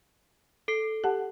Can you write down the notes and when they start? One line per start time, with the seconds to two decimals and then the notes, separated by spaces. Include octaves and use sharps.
0.68 A4 C7
1.04 G4 F#5 A5